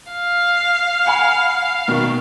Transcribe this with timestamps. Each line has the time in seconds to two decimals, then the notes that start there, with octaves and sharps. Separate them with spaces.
0.12 F5
1.06 F#5 G#5 B5
1.88 B2 D#3